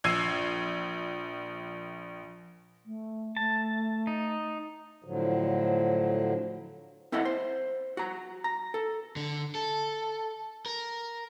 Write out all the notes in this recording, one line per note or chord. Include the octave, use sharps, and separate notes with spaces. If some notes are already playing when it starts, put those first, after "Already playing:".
A#1 E6 G#6 C7 D#7
A3
A3 A5
D#4
A2 D3 F3 F#3
C4 E4 A4 C#5 D#5 F#5
C5
F#4 A#5
A#5
A4
D3
A4
A#4